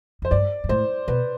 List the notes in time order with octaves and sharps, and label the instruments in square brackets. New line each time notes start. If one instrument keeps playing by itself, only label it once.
[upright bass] F2 [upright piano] C5
[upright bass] G2 [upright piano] D5
[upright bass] G2
[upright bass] A2 [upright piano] C5
[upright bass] B2 [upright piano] B4